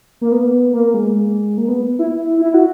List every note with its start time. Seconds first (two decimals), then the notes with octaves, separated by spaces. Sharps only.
0.21 A#3
0.32 B3
0.74 A#3
0.94 G#3
1.58 A#3
1.68 B3
1.99 E4
2.41 E4
2.54 F#4